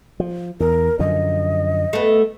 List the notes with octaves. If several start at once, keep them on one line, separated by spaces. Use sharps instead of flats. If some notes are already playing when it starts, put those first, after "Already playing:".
F3
E2 A#4
F#2 D3 F3 D#5
A3 B3